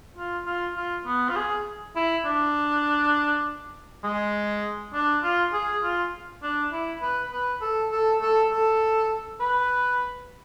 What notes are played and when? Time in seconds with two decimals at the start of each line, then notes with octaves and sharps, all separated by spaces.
0.17 F4
0.46 F4
0.76 F4
1.06 B3
1.29 F4
1.36 G#4
1.96 E4
2.25 D4
4.04 G#3
4.93 D4
5.23 F4
5.53 G#4
5.83 F4
6.42 D4
6.72 E4
7.02 B4
7.32 B4
7.61 A4
7.91 A4
8.21 A4
8.50 A4
9.40 B4